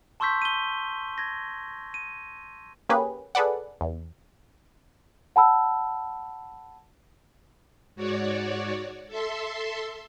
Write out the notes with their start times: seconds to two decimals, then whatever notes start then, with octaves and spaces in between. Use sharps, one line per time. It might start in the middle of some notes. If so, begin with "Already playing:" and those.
0.20 A5 C6 C#6 E6 G6 B6
0.42 D#7 G7
1.18 G#6 A#6
1.94 D#7
2.90 A#3 C#4 G4 G#4 B4
3.35 G#4 A4 B4 D5 F#5
3.81 E2
5.36 F#5 A5 B5 E6
7.96 G#2 F#4 C#5 D5
9.08 A4 E5 C6